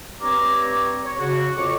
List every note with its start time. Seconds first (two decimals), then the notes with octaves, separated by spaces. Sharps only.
0.21 G2 C4 C#5 A#5 D6
1.04 C#5
1.19 C#3 F#4
1.56 F2 C#5 C#6 D6